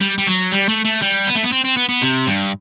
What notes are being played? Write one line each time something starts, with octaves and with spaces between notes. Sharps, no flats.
G3
G3
F#3
G3
A3
A3
G3
B3
A3
B3
C4
C4
B3
B3
C3
G2